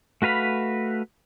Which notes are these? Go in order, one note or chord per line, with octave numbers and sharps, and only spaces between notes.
A3 F#4 B4 F5 B5